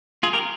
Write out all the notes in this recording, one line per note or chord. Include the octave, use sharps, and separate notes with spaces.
F4 G#4
G4 A#4